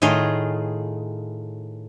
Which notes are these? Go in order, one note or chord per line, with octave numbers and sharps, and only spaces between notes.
A2 D#3 F4 G#4